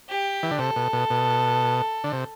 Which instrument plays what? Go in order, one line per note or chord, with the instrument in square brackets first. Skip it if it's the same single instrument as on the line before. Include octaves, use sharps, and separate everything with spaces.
[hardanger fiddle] G4
[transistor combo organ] E3
D3
[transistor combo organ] C3 [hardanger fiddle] A4
[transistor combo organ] B2
B2
B2
D3
C3